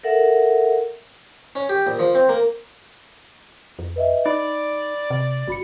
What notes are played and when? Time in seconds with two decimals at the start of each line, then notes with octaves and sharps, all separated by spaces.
0.03 A4 A#4 E5 F#5
1.55 C#4
1.69 G4
1.87 A#1
1.99 F3
2.15 C4
2.29 A#3
3.79 F2
3.96 B4 D#5 E5
4.26 D#4 D5 B5
5.10 C3
5.48 G1 F#4 B5 C#7